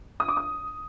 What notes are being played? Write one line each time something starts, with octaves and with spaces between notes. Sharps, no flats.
D#6
D6
D#6